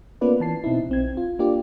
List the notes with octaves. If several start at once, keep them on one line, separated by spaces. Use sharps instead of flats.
A#3 B3 C#4 F4 B4 D5
E3 A5 C7
B2 C4 D#4 E4
B1 C4 G#6
F4
A#3 D4 F4 G4 D5